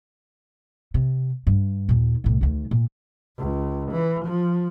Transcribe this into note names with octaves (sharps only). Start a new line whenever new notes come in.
C3
G2
D#2 A#2
C2 A2
D2 D#3
A#2
C#2
E3
F3